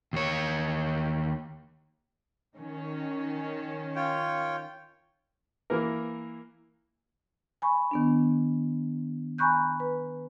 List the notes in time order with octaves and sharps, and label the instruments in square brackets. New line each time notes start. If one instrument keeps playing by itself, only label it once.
[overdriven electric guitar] D#2 C#5
[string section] D#3 C#4
[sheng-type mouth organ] F4 C#5 G5
[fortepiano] E3 A#3 A#4
[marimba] G#5 B5 C#6
D#3 B3 D4
G#5 A#5 B5 C#6 F#6 G6
B4